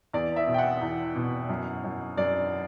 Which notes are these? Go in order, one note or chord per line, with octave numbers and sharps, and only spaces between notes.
E2 D5
E5
B2
G5
F#5
E2
B2
F#2
F#2
F#2 D5